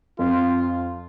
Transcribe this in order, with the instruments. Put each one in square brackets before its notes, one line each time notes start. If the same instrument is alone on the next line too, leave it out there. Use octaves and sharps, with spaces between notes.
[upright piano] F2 [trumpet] F4